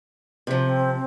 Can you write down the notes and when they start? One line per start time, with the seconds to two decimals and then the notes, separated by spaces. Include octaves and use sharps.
0.47 C3 F3
0.62 C4